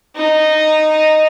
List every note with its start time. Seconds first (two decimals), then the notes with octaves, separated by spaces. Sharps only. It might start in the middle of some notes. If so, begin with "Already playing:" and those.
0.17 D#4